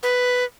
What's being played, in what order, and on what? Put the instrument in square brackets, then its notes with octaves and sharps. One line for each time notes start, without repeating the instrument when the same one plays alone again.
[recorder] B4